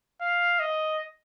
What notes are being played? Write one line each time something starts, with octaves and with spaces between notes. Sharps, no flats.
F5
D#5